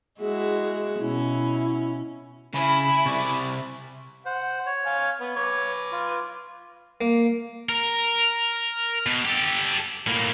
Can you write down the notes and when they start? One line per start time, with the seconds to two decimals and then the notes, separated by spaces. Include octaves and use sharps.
0.20 G#3 E4 F#4 G#4
1.00 B2 C#4 E4
2.54 C#3 E4 G#5 B5
3.06 C3 D5 C#6
4.25 C5 F#5
4.66 C#5
4.86 F5 G#5
5.21 B3
5.36 B4 C#5 D6
5.92 F4
7.01 A#3
7.69 A#4
9.06 B2
9.25 G4 A4
10.07 A2 A#3